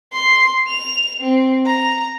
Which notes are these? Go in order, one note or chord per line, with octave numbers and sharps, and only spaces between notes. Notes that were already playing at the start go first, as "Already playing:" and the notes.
C6
F7
C4
A#5